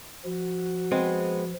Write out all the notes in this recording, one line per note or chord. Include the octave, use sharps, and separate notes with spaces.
F3 F#4
G#3 B3 C4